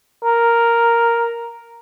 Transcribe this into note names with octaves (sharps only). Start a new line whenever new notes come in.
A#4